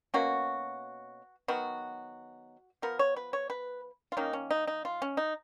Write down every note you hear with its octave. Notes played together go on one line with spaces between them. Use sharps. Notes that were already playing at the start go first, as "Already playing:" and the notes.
B2 A#3 C#4 F#4
D#3 F#3 B3 F#4
F3 B3 A#4
C#5
B4
C#5
B4
F4
D#3 A#3 C#4 D#4
C#4
D#4
D#4
F4
C#4
D#4